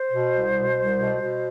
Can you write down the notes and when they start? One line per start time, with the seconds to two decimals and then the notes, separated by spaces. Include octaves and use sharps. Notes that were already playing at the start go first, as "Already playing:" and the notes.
Already playing: C5
0.11 B2
0.33 C2
0.55 B2
0.76 C2
0.98 B2
1.20 B2